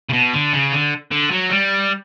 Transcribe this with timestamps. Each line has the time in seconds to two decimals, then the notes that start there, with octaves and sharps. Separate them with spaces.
0.09 C#3
0.13 B2
0.33 D3
0.53 C#3
0.72 D3
1.12 D3
1.31 F#3
1.51 G3